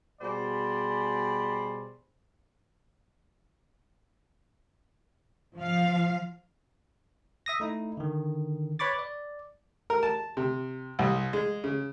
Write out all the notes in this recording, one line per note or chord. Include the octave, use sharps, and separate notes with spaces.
B2 G3 G#4 C5 D5 B5
F3 F5
E5 D#6 A#6
A3 D#4 E4
D3 D#3
B4 C#5 B5 C#6 D6 A6
D5
A#4
A5
C3
C2
G#3
C#3